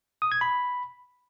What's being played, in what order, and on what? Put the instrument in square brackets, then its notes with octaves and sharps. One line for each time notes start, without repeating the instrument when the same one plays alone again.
[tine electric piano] D#6
G#6
B5